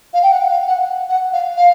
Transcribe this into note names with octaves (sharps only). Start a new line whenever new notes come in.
F5
G5
F#5
F5
F#5
F#5
F5
F5